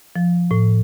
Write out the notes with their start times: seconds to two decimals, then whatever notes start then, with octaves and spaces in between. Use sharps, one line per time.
0.16 F3
0.51 A2